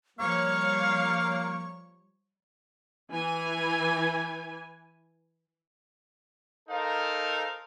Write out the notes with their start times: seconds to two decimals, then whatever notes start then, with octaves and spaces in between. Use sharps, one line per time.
0.19 F3 G3 A#3 C#5 F5 C#6
3.12 E3 G#5
6.69 D#4 A4 A#4 C5 F5